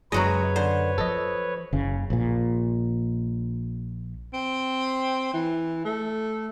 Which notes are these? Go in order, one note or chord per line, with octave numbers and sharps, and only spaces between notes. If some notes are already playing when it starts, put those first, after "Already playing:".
F#2 C#3 F#3 G#3 F#4 B4 C#5 D#5
D3 C5
F3 A4 D#5
F#1 C#3
A#1 A#2
C4
E3
A3